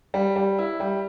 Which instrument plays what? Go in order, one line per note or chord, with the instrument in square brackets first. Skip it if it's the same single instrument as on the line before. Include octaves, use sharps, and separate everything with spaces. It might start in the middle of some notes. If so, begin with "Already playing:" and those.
[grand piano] G3
G3
E4
G3